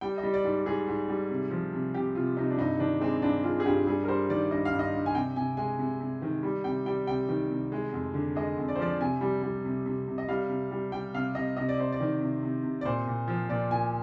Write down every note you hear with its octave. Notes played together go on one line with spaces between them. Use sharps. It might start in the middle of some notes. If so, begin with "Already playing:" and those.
G3 G5
D#5
G3
D5
G#2
G#2 G#4
G#2
G3
C3
F3
C3
C3 G4
C3 F4
C3 D#4
D4
G2 D#4
D#3 D4
G#3 C4
G2 D4
G#3 F4
G#4
G2 G4
G3 G#4
A#4
G3 C5
D#3 D5
G2 D#5
F5
G2
D#5
G2
G#5
C3 G5
C3 G#5
G#3 G#5
C3
C3
D#3
G3
C3 G5
G3 G5
C3 G5
D#3
C3
G#3
F2
D3
G#3 D#5
F2
D5
C5
F3 D5
C3 G#5
G3
G3
C3
C3
C3
D#5
G3 F5
C3
G3
G3 G5
C3 F5
C3 D#5
C3 D#5
D5
C3 C5
D5
D#3
C3
C3
C3
D5
A#2 C5
A#2
F3
A#2 D5
A#2 G#5